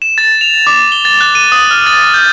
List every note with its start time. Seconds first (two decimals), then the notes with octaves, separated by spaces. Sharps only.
0.02 E7
0.18 A6
0.41 F7
0.67 D6
0.92 G7
1.05 A6
1.21 F#6
1.35 D#7
1.52 D#6
1.71 F6
1.86 A6
2.14 G6